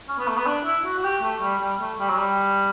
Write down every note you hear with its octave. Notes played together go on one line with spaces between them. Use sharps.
C#4
B3
A3
B3
D4
E4
F#4
F#4
G4
A3
G3
G3
A3
G3
F#3
G3